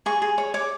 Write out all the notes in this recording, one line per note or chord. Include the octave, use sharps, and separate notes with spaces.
G#4 C#6
G#4
C#5
C#5 D6